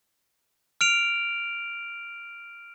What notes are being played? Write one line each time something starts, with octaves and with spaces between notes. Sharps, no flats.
F6 D7 F7